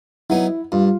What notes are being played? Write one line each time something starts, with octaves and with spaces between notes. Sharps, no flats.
F#3 B3 D#4 E4
G2 F4